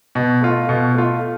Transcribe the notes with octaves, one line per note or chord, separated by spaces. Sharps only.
B2
A3 F4
B2
A3 F4